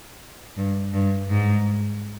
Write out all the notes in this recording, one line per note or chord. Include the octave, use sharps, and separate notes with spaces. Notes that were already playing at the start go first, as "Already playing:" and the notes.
G2
G2
G#2